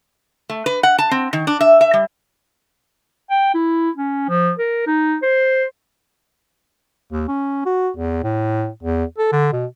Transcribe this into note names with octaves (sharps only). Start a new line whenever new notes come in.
A3
B4
F#5
A5
C4
D#3
D4
E5
E5
G3
G5
E4
C#4
F3
A#4
D#4
C5
D#2
C#4
F#4
E2
A2
E2
A4
D3
B2